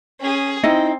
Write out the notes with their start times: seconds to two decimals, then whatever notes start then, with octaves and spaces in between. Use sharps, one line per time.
0.20 C#4 G#4
0.64 C4 D#4 E4 D#5